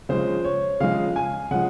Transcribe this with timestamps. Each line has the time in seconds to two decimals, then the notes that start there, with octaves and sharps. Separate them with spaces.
0.09 C#3 F3 G#3 C5
0.45 C#5
0.80 C#3 F3 G#3 F5
1.16 G#5
1.51 C#3 F3 G#3 F#5